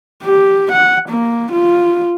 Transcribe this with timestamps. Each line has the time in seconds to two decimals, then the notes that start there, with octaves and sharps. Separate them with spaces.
0.23 G4
0.72 F#5
1.09 A#3
1.52 F4